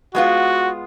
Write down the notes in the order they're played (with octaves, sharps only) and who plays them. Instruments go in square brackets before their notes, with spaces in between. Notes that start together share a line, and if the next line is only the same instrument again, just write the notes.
[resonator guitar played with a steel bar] G#3 B3 F4 [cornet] F#4